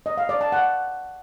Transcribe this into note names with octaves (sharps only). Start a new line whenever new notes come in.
D#5
F5
D5
A5
F#5